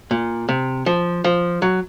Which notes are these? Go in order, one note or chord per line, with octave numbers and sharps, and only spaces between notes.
A#2
C3
F3
F3
F#3